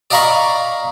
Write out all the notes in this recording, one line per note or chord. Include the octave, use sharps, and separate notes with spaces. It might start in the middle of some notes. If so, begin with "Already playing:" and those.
D5 D#5 F5 A#5 B5 C#6